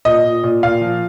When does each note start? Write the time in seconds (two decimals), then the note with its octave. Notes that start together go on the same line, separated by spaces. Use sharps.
0.05 A#2 D#5
0.24 A#2
0.43 A#2
0.63 A#2 F5
0.81 F3